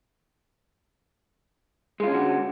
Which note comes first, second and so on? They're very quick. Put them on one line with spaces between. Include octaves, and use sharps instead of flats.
G#3 F4 C#4 D3 F#4